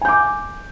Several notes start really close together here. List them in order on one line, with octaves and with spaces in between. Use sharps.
G#5 G6 D6